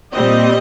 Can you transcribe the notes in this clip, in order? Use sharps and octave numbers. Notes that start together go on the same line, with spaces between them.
A#2 G3 C4 D#5